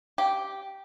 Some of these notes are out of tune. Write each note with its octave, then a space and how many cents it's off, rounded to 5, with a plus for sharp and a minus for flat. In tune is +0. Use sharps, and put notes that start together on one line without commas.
G4 -5